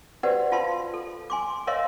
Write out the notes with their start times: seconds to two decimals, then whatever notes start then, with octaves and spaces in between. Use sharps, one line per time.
0.23 F#4 G4 B4 C5 D5 F#5
0.52 F4 F5 A5 B5 C6
0.94 A4
1.30 G#5 C6 D6
1.67 A#4 C#5 D#5 F5 C6